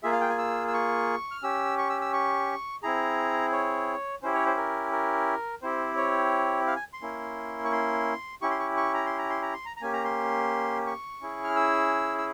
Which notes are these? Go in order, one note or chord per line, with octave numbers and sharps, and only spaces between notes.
A#3 F4 G#4 E5
F5
G5
G#5
E6
E6
C#6
F6
C#4 G4 E6
C#6
E6
E6
C#6
C4 E4 G#4 A#5
C#5
C#4 E4 G4 C5
C#5
C5
A#4
A#4
C4 E4 G4 C5
C#5
F5
G#5
C6
A#3 C#4 E4
C#6
C6
C#4 E4 G4 C#6
C6
C#6
C#6
A#5
C6
A#5
C6
A#5
C6
A#5
A#5
A#3 C#4 G4 G#5
A#5
C6
C#6
C#4 E4 G#4
F6
E6
E6